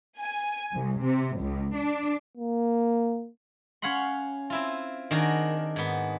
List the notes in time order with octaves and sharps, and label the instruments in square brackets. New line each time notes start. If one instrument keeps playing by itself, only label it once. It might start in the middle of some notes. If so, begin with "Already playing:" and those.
[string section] G#5
C2
C3
C#2
D4
[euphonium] A#3
[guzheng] C#4 C#5 F5 F#5 B5 C6
C4 E4 F4
D#3 D4 F#4 G#4 A#4
G#2 B3